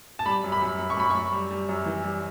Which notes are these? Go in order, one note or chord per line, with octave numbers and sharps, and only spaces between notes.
A5
G3 B5
F#2
B5
F#2
F#2
C#6
F#2 B5
F#2 C#6
G3
G3
F#2
E3
G3